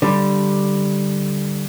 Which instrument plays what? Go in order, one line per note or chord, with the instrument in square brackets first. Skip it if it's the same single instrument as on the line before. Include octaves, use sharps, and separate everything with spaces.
[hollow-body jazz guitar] D3 G3